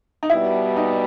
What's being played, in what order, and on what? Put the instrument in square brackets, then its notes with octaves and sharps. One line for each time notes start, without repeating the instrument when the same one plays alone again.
[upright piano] D#4
[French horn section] B2 G3 B3 [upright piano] E4
[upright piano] D#4